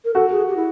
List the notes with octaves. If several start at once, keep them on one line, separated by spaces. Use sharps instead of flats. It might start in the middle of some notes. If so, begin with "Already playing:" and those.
A#4
F#4 A4
G#4
G4
E4